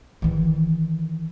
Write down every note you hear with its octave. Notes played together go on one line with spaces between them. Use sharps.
D#3 E3